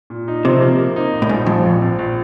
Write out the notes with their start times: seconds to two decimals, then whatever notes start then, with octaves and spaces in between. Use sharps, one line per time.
0.10 A#2
0.28 D#4
0.45 C3 F3
0.61 A#3
0.79 A#3
0.96 D#4
1.13 A#1
1.22 A2
1.29 A#1 G#2
1.46 A#1 F2
1.64 A#1
1.82 A#1
1.99 A#1